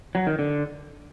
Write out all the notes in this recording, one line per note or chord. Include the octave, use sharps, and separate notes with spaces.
F#3
D#3
D3